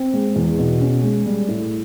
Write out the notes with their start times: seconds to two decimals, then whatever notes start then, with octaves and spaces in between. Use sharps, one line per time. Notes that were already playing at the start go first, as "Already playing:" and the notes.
Already playing: C4
0.14 G#3
0.36 E2
0.59 B2
0.81 C#4
1.03 G#3
1.26 G3
1.48 A2